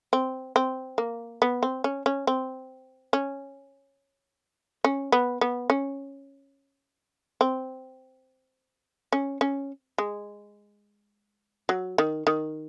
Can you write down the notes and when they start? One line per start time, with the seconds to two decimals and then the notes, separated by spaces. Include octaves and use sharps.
0.13 C4
0.56 C4
0.98 A#3
1.42 B3
1.63 C4
1.84 C#4
2.06 C#4
2.27 C4
3.13 C#4
4.84 C#4
5.12 B3
5.41 B3
5.70 C#4
7.41 C4
9.12 C#4
9.41 C#4
9.98 G#3
11.69 F#3
11.98 D#3
12.27 D#3